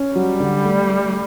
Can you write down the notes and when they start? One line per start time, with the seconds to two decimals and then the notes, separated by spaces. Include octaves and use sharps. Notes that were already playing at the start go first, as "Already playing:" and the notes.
Already playing: C#4
0.15 F#3 G3
0.40 D3
0.65 A3
0.89 A3